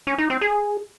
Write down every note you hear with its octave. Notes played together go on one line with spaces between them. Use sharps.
C#4
D#4
C4
G#4